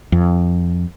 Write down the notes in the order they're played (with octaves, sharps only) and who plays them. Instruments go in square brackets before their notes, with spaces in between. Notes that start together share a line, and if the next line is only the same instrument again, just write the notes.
[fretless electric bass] F2